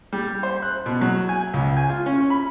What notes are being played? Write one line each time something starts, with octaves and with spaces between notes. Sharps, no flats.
G3
C5
F#6
B2
F#3
G#5
C#2
G#5
F4
C#4
B5